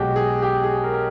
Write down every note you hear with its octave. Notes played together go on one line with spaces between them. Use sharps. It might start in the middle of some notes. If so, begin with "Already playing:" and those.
Already playing: B1 B2 G#3 F#4 G4
G#4
G4
G#4
A#4
A#4